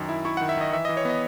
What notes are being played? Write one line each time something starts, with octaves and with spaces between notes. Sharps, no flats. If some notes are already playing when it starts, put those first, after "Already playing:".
Already playing: F#2 D#3
E4
E4 C#6
D#3 F#5
E5
D#3 D#5
E3 E5
E3 D#5
C#5
B3 D#5